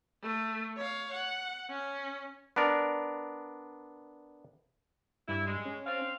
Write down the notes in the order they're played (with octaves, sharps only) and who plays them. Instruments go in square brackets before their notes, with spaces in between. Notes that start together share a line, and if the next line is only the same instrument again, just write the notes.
[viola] A3
C#5 F5
F#5
C#4
[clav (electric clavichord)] B3 D4 A#4 D5
[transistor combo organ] G2 [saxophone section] E4
[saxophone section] G#3
[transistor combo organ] C#4
[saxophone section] C4 F5